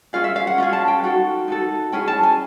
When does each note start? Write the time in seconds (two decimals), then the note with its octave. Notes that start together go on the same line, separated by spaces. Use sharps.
0.13 C#4 F4 G#4 F5
0.24 E5
0.36 F5
0.47 F#5
0.58 C#4 F4 G#4
0.73 A5
0.88 G5
1.03 D#4 F#4 A4 F#5
1.48 D#4 F#4 A4
1.92 C#4 E4 G#4 G5
2.08 A5
2.23 G#5